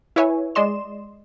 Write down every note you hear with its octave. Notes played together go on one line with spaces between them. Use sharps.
E4 B4 C#5 E5 G#5
G#3 D5 D#5 C6 E7